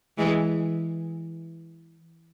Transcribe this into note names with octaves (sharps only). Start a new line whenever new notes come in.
E3 G#3